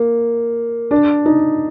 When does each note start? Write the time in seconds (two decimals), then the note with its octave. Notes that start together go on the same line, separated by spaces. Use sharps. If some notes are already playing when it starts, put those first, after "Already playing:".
Already playing: A#3
0.91 D4
1.25 D#4